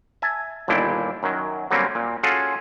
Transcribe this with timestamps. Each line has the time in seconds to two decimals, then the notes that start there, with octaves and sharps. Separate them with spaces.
0.22 E5 G#5 A5
0.68 G1 D#2 A#2 D4 E4 G5
1.23 F#2 D#3 F#3
1.71 D3 F#3 G3 A#3 C4 C#4
1.95 A#2
2.23 C#4 F4 F#4 G#4 A4